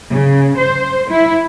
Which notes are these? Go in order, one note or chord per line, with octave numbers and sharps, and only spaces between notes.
C#3
C5
E4